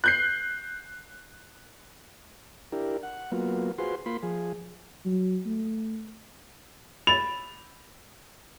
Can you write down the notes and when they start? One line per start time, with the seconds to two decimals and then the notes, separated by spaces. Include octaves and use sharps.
0.04 F#6 G6 C7
2.72 D4 E4 G4 A#4
3.03 F#5
3.32 F#3 A#3 B3 F4
3.78 F4 F#4 G#4 B4 C5 C6
4.06 A#3 F4 B5 C6
4.23 F3 G#4
5.05 F#3
5.46 A3
7.07 B5 A6 F7